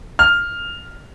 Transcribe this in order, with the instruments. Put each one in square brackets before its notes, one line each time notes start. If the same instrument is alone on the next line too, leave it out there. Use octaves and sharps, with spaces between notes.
[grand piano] F6